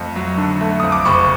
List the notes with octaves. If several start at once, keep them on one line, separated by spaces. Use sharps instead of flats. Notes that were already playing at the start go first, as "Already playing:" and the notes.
Already playing: F2 A3
F#3
D3
A3
F2 D#6
D6
F#1 B5 C#6